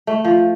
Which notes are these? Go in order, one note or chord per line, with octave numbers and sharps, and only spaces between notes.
A3
F3